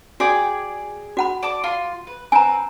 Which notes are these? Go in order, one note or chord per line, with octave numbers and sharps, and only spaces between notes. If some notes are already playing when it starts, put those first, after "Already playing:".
F#4 G#4 D5 G5
F#4 F#5 B5
D5 A5 D6
F4 C6
B4
C4 B4 G#5 A#5